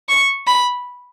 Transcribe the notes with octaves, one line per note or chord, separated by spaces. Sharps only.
C#6
B5